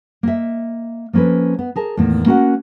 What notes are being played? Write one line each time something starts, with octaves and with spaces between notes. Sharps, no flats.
A#3 D#5 E5
F3 A#3 C#4 A4 B4
B3
G#4 A#4 A5
E2 A2 D#3 A#3
A#3 C#4 F#4 A#4 F#5